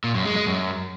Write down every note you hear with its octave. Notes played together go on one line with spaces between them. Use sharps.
A#2
F#2
G#3
G#3
F#2